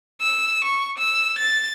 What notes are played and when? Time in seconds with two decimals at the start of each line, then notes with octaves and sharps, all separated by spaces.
0.22 E6
0.65 C#6
0.98 E6
1.39 A6